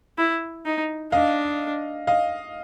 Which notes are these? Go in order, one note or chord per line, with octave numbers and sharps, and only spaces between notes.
E4
D#4
D4 D#5 F5
D#5 F5